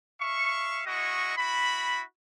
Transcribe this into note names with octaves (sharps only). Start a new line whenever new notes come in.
E5 F5 C#6
G#3 E4 F#4 D#5 C#6
E4 F#4 B5